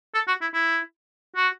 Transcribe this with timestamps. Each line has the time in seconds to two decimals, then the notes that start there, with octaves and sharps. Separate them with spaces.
0.14 A4
0.28 F#4
0.41 E4
0.54 E4
1.36 F#4